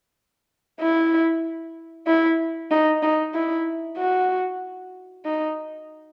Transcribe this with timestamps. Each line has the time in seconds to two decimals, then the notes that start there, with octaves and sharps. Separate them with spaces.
0.81 E4
2.07 E4
2.71 D#4
3.03 D#4
3.35 E4
3.98 F#4
5.25 D#4